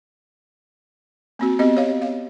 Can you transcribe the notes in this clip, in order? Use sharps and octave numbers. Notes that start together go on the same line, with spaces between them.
A#3 C4 F#4
B3 C4 G4 D#5
C#5 F5
F5